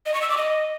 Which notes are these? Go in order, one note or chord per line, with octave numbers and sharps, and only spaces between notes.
D#5
C#6
E6
D6
D#5